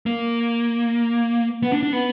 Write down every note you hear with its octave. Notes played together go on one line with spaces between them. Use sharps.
A#3
B3
D4
D4
B3